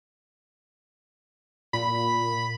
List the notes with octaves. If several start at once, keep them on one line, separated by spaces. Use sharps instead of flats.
A#2 B5